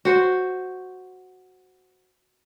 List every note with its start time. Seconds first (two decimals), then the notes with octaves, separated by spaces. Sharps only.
0.05 F#4 C5